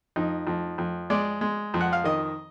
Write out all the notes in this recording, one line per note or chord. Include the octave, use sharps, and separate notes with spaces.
F2 D#4
F2
F2
G#3 D5
G#3
F2
F#5
F5
D#3 D#5